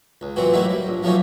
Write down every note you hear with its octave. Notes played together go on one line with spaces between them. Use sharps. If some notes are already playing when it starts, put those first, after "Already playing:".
C#2
A#2 E3 F#3 B3 C4 F#4
F#3 G3 A3 A#3 D#4 E4
G3
A#1
F3 F#3 A3 A#3 C#4 D#4